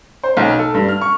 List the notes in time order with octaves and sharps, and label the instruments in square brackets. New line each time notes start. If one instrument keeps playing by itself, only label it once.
[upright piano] C5
B1
A4
G2
F6
C#6